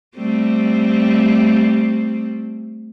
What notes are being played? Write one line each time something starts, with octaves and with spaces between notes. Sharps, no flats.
G3 A3 C4